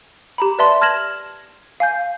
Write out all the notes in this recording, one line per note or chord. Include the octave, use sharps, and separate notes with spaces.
G4 A#5 B5
B4 D5 E5 A5 C6
A5 F6 G#6 A#6 E7 F#7
F5 G#5 G6